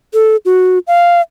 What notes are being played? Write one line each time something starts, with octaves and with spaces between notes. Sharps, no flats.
A4
F#4
F5